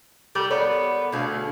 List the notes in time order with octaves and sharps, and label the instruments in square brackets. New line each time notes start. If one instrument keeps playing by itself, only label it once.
[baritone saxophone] G3 [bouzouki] A4 A#4
[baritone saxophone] B3 [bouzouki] A#4 C#5 D5
[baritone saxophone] D2 [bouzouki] B2 G#4 F5